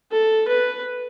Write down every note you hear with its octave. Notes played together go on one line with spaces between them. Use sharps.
A4
B4